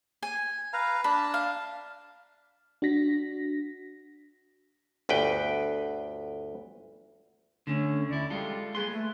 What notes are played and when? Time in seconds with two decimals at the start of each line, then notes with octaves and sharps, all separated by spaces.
0.22 G#5
0.73 B4 F5 A#5
1.04 D4 A5 B5
1.34 F5
2.82 D4 F#4 A#6 B6
5.09 G1 D2 B4 G5
7.67 D3 A3 C#4
8.09 D2 E4 D5
8.30 G3 G#3 F4 A4
8.75 A#3 G#4 B4 C6
8.92 A3